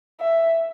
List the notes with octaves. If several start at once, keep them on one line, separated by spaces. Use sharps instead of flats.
E5